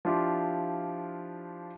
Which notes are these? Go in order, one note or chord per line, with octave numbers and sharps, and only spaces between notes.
F3 D4 E4 F4 G4